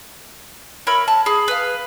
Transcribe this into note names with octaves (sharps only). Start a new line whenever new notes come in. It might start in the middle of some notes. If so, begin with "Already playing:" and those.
A#4 C#5 E5 B5
A5
G#4 B5
B4 F5